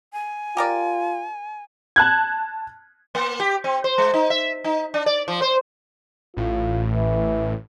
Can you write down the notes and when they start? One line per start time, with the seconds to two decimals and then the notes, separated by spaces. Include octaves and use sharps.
0.13 G#5
0.57 F4 G4 A#4 D5
1.96 A5 F#6 G#6
3.15 A#3
3.40 G4
3.64 C4
3.84 C5
3.98 G#3
4.14 D#4
4.30 E5
4.64 D#4
4.94 D4
5.06 D5
5.28 F3
5.42 C5
6.37 A1 A2 F4
6.94 E3